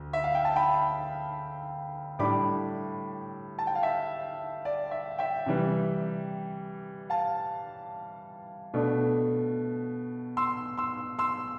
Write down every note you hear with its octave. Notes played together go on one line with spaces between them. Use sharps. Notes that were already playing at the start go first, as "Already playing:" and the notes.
Already playing: D2
E5
F5
G5
A5
G5 B5
A2 G3 D4 B5 D6
A5
G5
F5
E5
D5
E5
E5 G5
C3 E3 G3
F5 A5
B2 A3 D4
C6 E6
C6 E6
C6 E6